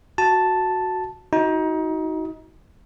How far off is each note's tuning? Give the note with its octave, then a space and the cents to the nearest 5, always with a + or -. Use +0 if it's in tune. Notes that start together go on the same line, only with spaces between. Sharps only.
F#4 +0 A5 +0
D#4 +25 F#4 +0